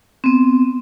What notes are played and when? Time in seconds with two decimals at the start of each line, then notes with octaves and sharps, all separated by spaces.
0.24 B3 C4